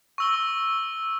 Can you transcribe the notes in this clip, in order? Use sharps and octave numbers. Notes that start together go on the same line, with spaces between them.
C#6 E6 G7